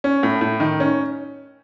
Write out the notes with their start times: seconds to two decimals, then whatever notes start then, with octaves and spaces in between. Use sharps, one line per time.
0.04 C#4
0.23 A2
0.41 A2
0.60 D#3
0.80 C#4